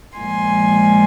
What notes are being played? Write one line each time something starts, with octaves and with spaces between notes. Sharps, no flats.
A#2 F3 G#3 G#5 C6